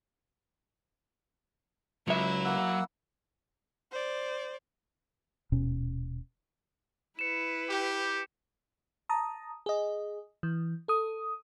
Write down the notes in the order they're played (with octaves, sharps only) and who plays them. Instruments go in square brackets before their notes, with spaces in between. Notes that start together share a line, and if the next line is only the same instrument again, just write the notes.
[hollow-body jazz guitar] C#2 E5 [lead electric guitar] F#3 [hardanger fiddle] E4
[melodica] A#3 F#5 E6
[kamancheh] C5 D5
[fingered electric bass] D#1 B2 C#4
[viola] E4 B4 [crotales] C#7 E7
[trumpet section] G4
[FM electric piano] A5 A#5 D#6
G#4 D#5
E3
A4 D#6